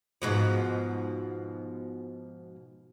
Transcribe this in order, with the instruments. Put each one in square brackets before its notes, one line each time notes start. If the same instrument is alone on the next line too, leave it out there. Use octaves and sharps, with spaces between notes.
[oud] G#2 B2 F3